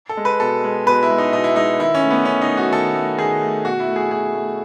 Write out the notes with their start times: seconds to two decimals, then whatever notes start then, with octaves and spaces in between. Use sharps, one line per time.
0.09 A4
0.17 G#3
0.25 B4
0.40 B2 A4
0.64 G#3
0.86 B2 B4
1.03 E4
1.10 G#3
1.18 D#4
1.33 B2 D#4
1.44 E4
1.56 G#3 D#4
1.80 D#3 E4
1.95 C#4
2.02 A3
2.11 B3
2.25 D#3 C#4
2.41 D#4
2.48 A3
2.57 F#4
2.71 D#3 A4
2.95 A3
3.18 D#3 G#4
3.42 A3
3.65 B2 F#4
3.80 E4
3.87 A3
3.96 G#4
4.11 B2 G#4
4.35 A3